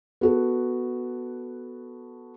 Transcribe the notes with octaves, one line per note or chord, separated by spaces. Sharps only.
B3 F#4 A4